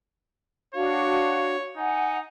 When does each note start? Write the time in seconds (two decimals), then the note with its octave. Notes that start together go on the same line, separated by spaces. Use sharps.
0.74 D4 F#4 C#5 F5
1.77 D#4 F#5 G#5